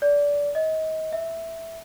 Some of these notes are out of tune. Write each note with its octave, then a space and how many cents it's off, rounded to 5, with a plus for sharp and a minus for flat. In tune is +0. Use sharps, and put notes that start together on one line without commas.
D5 -20
D#5 +30
E5 +0